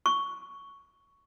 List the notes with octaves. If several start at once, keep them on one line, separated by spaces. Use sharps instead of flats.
C#6